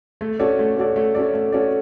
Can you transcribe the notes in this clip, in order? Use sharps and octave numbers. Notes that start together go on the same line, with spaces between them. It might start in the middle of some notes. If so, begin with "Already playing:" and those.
A3
C#4 F#4 A4 D5
A3
C#4 F#4 A4 D5
A3
C#4 F#4 A4 D5
A3
C#4 F#4 A4 D5